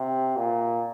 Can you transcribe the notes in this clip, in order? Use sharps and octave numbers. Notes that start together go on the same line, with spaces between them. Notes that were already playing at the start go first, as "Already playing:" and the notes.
Already playing: C3
A#2